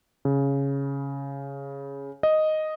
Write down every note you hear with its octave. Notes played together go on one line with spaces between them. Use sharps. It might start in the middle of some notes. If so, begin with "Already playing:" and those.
C#3
D#5